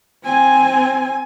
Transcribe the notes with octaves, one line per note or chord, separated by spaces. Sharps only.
C4 G#5